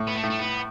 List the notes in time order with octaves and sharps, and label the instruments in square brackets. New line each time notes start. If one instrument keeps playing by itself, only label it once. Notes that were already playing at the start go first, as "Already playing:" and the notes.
Already playing: [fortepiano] A2
[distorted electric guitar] B3
A3
[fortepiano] A2
[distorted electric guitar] A3
B3